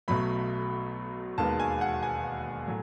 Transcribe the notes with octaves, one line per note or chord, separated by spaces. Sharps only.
B1 B2 F#3 A3 B5
E1 D#2 D#3 G#3 B3 A5
G#5
F#5
G#5
A2 F#3